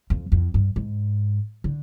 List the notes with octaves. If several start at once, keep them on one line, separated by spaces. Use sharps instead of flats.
F2
F2
G2
G#2
D3